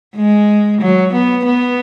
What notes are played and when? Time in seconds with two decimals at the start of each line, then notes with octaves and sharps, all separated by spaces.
0.16 G#3
0.82 F#3
1.14 B3
1.46 B3